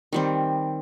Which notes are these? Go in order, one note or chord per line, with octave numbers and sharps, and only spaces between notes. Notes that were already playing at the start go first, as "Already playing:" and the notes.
D#3 G3 C4